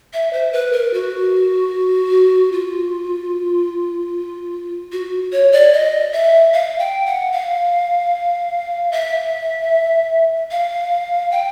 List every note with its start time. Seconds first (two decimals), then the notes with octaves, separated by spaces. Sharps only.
0.14 E5
0.33 C5
0.53 B4
0.72 A#4
0.94 F#4
2.52 F4
4.92 F#4
5.32 C#5
5.52 D5
5.73 D#5
6.13 E5
6.53 F5
6.79 G5
7.06 F#5
7.32 F5
8.92 E5
10.51 F5
11.32 G5